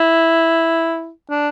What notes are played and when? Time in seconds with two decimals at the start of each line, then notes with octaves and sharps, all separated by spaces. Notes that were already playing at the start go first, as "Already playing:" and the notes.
Already playing: E4
1.30 D4